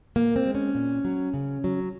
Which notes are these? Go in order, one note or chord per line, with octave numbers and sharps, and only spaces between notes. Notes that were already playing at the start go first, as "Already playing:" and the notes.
A#2 A#3
C4
G#3
C#4
A#2
F#3
C#3
F#3